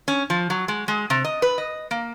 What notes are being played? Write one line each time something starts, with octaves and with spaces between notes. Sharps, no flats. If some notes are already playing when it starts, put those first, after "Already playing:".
C#4
F3
F#3
G#3
G#3
C3
D#5
B4
D#5
A#3